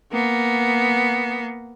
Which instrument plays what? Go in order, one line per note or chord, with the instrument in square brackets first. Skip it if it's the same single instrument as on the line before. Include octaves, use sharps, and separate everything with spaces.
[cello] A#3 B3